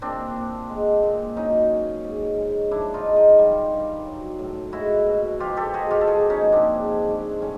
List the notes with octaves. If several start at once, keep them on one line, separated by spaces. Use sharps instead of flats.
A#2 C4 D4
A#2
G#3
A#2
F#3 C#4 D#4
A#2
G#2
G#3
F3 D4 E4
D#4 F4
G#3
D#4 F4
G3
G2
F#3
A2
G#3 E4 F#4
B2
F3 F4 G4
G4 A4
G#3 F#4 G#4
F4 G4
A4
F3 F#4 G#4
C#4 D#4
A#2
C4 D4
G#2
G#2
A2 C#4